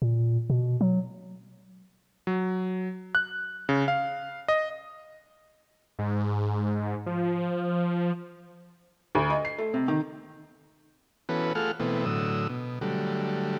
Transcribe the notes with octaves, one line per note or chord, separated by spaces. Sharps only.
A#2
B2
F#3
F#3
F#6
C#3
F5
D#5
G#2
F3
D2
D#5
C7
A3
C3
D#3
E3 B3 C#4 F#4 A4 B4
A3 F4 G#4 A4 F#5 F6
B2 E3 A3 B3 C4
A2 D3 F#3 D#6 E6
B2
D3 F#3 G3 A3